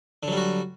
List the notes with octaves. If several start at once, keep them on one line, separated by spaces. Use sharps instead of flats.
D3 F#3 G3 F#4